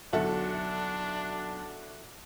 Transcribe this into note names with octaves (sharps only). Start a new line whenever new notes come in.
B1 D3 D4 E4 F#4 A4 F#7